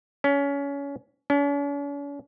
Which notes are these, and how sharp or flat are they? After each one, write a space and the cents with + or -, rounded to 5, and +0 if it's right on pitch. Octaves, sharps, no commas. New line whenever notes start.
C#4 +25
C#4 +45